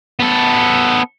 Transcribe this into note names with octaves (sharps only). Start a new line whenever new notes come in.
B3 A4